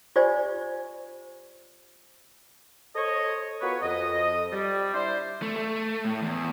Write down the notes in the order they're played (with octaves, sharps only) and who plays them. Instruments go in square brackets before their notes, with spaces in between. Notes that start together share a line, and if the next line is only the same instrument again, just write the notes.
[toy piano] F4 G4 C5 D5 G#5
[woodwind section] A4 C5 C#5 D#5
B3 F4 F#4 A#4 B4 C#5
F2 D#5
G3
D4 E4 G4 C5
[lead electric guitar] A3
A3
A2
E2